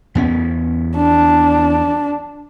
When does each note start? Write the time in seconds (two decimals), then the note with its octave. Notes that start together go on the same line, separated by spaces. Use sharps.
0.15 E2 B3 C#4
0.97 D4